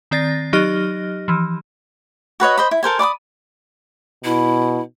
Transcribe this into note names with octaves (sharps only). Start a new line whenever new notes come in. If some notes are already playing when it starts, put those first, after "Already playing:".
D#3 C4 D5 A6 A#6
F#3 D#4 G4 D#5 F6 A#6
E3 F3
F#4 B4 C#5 D#5
C5 D#5 B5
E4
A4 A#4 C5 G#5
D5 B5 C#6 D#6
B2 E4